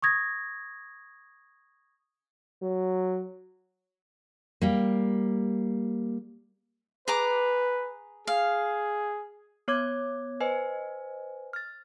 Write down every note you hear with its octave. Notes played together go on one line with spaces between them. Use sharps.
C#6 D#6 G#6 A#6
F#3
G3 A#3
G#4 B4 A#5 D6
G#4 F5
B3 C#5 D6 G#6
B4 C5 D#5 G#5
F6 A6